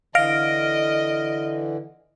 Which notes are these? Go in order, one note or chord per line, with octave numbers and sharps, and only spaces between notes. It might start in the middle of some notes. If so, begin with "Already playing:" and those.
D3 E3 D#5 F5 F6 A#6 D7